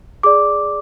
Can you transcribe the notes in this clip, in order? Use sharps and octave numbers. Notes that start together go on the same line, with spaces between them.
G#4 D5 D6